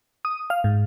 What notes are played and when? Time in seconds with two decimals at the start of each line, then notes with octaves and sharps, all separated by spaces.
0.25 D#6
0.50 F5
0.64 G#2